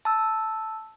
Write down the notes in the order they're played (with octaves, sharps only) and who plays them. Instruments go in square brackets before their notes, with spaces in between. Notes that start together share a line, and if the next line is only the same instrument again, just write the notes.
[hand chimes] A5 E6